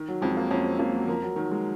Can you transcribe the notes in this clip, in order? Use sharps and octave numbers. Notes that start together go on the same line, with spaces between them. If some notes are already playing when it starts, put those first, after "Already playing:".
Already playing: D#3
F#3
F2 G#3
A#3
F2 C#4
C4
F2 A#3
F#3
F3 A#4
F#3
D#3 F#3
G#3